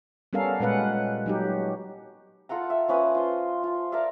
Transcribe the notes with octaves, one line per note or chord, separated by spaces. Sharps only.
G3 B3 C#4 A4 A#4 F5
A#2 G#3 C#4 B4 F5 F#5
F#3 D#4 G4
F4 A4 F#5 A#5
E5
F3 C#4 B4 D#6
F4 C5
F4
A#4 D5 E5 F5